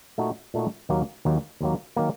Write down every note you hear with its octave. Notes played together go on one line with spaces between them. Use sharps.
A#2 A3 D#4 F#4
A#2 A3 D#4 F#4
D#2 D#3 F#3 A#3
D#2 D#3 F#3 A#3
D#2 D#3 F#3 A#3
D#3 F#3 A#3